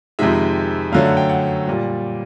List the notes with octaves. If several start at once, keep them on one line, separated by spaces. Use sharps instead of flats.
F2 C3 D#3 G#3 E5
F#2 D3 F#3 A3 F5
F#5
G5
F#5
A#2 G3